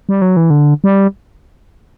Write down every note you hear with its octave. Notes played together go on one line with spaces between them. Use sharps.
G3
F#3
E3
D3
G3